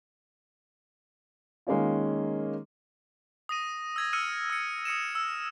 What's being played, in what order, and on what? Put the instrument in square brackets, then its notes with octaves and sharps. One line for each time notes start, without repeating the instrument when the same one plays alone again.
[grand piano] D#3 G#3 A#3 C#4 F4
[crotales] D#6 A#6 D#7
E6 G#6 A#6
E6 F6 C#7 D#7
E6 C#7
D#6 C#7 D#7 E7
E6